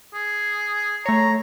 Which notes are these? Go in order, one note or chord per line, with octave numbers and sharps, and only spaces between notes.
G#4
A3 C#5 A#5